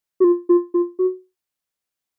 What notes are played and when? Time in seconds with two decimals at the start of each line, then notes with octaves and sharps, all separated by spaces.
0.20 F#4
0.24 F4
0.49 F4
0.74 F4
0.99 F#4